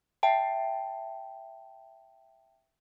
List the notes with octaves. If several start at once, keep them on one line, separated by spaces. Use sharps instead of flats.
E5 G5 A5